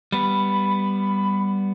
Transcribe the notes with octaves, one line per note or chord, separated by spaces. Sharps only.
G3 B3 B5